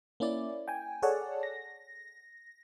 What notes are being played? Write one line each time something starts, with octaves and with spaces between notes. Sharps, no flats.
A#3 C#4 E4 D5
G5 G#5
G#4 A4 C#5 D5 F#5 A5
A#6